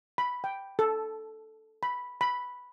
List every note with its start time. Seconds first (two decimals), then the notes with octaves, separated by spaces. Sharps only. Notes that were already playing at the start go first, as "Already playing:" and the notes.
0.18 B5
0.44 G5
0.79 A4
1.83 B5
2.21 B5